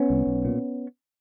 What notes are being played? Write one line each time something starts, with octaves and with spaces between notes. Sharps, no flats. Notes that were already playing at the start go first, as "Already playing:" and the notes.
Already playing: B3 C#4
C2
B1
A#2